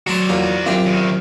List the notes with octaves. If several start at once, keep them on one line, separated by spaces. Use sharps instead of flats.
F#3 F#4 D5 A5 C6
E2 F#3 A#3 F4
F#2 C4 F4 G4
E2 D#3